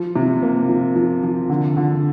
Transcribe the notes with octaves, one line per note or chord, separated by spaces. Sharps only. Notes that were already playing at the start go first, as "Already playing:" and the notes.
Already playing: F3
C3
A#3
F3
F3
F3
D3
D3